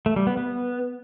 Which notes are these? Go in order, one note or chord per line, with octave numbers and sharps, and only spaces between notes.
A3
G3
B3
B3